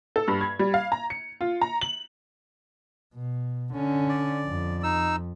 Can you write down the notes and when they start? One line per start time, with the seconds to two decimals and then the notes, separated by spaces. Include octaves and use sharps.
0.16 A4
0.28 G2
0.41 G#6
0.59 G3
0.74 F5
0.92 A#5
1.10 C#7
1.41 F4
1.62 A#5
1.81 F#7
3.15 B2
3.73 D3 C#4
4.09 D5
4.46 F2
4.83 D#4 E6